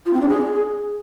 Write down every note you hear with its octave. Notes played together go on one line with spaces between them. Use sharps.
F4
C4
D4
G#4